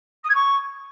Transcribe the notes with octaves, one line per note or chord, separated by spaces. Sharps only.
D#6
G#6
C#6